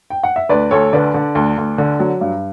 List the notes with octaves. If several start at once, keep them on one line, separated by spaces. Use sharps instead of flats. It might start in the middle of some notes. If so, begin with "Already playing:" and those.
G5
F#5
E5
D2 B4 D5
D2 A4 C#5
D3 B4 D5
D3
D2
D2
D3
F#3
G2